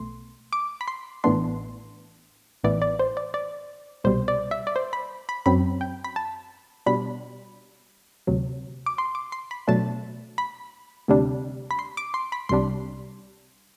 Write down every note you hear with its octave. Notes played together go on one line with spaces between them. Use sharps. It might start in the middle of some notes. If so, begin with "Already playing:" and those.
Already playing: B1 B2 A3 C6
D6
B5
C6
A1 A2 E3 B3 D4 C6
A1 A2 E3 B3 E4 D5
D5
C5
D5
D5
C2 B2 G3 C5
D5
E5
D5
C5
B5
B5
F#2 F#3 C4 B5
G5
B5
A5
B2 G3 D4 B5
D2 C3 F#3
D6
C6
D6
C6
B5
B2 F#3 A3 D4 A5
B5
D2 C3 G3 D4
B5
C6
D6
C6
B5
C2 C3 G3 D4 C6